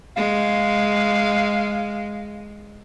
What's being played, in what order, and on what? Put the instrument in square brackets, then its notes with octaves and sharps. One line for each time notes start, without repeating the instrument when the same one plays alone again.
[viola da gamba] G#3 [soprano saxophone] F5